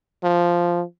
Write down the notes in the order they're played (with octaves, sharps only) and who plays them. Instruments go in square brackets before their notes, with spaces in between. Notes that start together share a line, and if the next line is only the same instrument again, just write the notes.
[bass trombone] F3